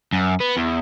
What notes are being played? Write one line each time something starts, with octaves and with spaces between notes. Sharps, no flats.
F#2
B3
E2